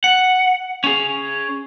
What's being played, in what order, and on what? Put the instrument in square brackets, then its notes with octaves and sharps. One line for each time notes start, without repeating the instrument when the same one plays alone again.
[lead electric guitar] F#5
C#4 G#4